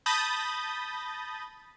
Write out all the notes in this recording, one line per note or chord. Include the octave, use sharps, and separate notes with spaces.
A5 B5 D#6 G6 A6 A#6